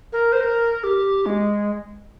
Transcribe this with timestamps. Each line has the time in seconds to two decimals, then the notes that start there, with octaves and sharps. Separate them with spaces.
0.13 A#4
0.33 C5
0.41 A#4
0.84 G4
1.26 G#3